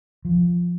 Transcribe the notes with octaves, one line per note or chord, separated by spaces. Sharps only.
F3